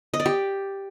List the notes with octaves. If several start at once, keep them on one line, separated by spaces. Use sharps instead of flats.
D#5
D5
G4